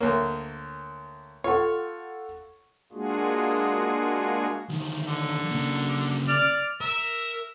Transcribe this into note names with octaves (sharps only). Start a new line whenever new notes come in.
D2 A#3 C#5
F4 A4 C#5 F#5
G#3 A#3 D4 F4 F#4 G#4
D2 D#3
D3
C#3 A#3
D5 F6
A#4 E5